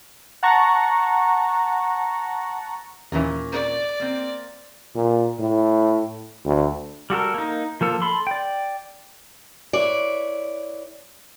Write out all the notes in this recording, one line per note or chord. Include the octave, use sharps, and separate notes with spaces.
F#5 A5 A#5 C#6
D#2 A#2 E3 C#4 A#4
D5
A#3 C4
A#2
A2
D2
G3 F#4 A4 A#4
A#3 D#4
F3 A#3 A4
A4 B5 C6
D5 G5
E4 B4 C#5 D5